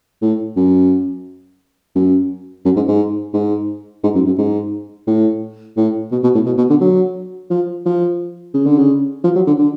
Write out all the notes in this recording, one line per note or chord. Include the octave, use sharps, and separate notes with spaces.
A2
F#2
F#2
F#2
G#2
G#2
G#2
G#2
F#2
F#2
G#2
A2
A2
B2
B2
A2
B2
B2
D3
F#3
F3
F3
C#3
D3
C#3
F3
F#3
D3
D3